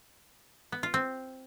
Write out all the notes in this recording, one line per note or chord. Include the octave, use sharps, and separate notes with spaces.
B3
F4
C4